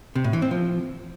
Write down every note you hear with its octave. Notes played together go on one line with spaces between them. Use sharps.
C3
A2
E3
C4
F3